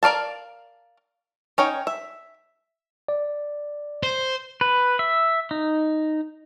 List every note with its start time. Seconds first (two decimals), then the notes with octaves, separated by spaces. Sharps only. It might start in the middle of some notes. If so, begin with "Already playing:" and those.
0.03 A#4 D5 F5 A5
1.58 C#4 D#4 C#5 G5
1.87 E5
3.08 D5
4.03 C5
4.61 B4
4.99 E5
5.51 D#4